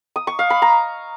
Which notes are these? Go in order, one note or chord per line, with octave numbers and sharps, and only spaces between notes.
D#6
C#6
F5
B5
A#5